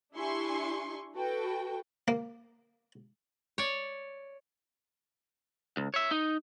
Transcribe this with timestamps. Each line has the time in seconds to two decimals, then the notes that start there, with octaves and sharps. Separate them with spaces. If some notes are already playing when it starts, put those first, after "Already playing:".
0.14 D4 E4 G4 G#5 C6 C#6
1.15 F#4 A4 B4 G5
2.08 A#3
3.58 C#5 D5
5.77 C#2
5.94 C#5 E5
6.11 D#4